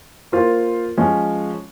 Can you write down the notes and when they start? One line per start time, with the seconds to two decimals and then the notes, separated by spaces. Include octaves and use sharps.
0.32 A#3 F4 C5 F5
0.97 F3 G#3 C#4